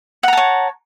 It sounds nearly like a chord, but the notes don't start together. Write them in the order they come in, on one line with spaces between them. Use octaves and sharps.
F#5 A#5 A5 C#5